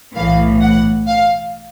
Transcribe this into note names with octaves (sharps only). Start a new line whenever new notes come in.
B1 A2 E3 F5
F#5
F5